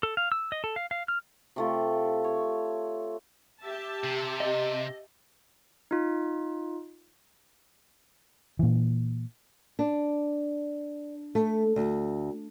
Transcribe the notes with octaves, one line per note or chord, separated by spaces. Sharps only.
A4
F5
E6
D#5
A4
F5
F5
F6
C3 A3 F4
C#5
G4 E5 A5
C3
D#5
D#4 F4
A#2 E3
D4
A3
D2